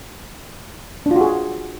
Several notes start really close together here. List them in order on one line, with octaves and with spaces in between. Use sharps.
D4 F4 F#4 G#4